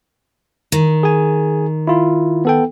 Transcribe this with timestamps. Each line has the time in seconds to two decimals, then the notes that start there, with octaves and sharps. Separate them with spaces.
0.72 D#3
1.03 G#4 G#5
1.87 E4 F4
2.45 B3 A4 G5